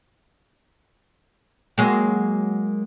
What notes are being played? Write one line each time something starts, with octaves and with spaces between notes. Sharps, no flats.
F#3 G#3 A#3